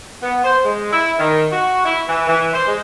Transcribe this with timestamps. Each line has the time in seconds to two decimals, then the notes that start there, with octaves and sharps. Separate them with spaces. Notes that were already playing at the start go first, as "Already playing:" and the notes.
0.22 B3
0.44 C5
0.64 G#3
0.92 E4
1.18 D#3
1.51 F#4
1.84 E4
2.07 E3
2.27 E3
2.53 C5
2.67 G#3